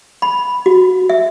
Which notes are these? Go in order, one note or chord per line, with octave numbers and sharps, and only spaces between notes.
B5
F#4
E5